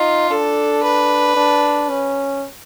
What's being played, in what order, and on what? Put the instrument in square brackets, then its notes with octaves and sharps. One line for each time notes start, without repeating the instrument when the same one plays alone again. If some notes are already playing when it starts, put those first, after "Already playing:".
Already playing: [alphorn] D#4 [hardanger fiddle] F4
[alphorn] D4 [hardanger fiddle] A4
[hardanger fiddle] B4
[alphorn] D4
C#4